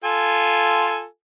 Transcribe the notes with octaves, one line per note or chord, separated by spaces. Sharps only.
F4 A4 G#5